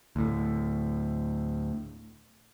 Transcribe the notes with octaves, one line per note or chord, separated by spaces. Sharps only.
D2 A2